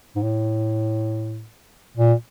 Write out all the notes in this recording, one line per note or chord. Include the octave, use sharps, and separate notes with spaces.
G#2
A2
A#2